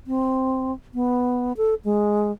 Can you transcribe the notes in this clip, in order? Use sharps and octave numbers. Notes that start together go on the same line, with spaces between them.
C4
B3
A4
G#3